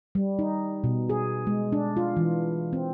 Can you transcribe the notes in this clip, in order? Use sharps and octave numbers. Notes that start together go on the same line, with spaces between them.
G3
D#4
B2
G#4
G#3
D4
F4
E3
C4